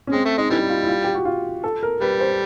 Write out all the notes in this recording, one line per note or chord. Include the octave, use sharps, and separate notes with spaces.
C#4
G#3 C4
A3
G#3 D#4
D3 E3 G3 E4
F4
E4
F4
G4
F#4
F4
A4
A#4
G3 B4
C5